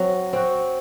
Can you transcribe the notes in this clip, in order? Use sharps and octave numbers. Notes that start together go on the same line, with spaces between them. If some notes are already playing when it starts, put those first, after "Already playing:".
Already playing: F#3 C4 F#4
C4 F#4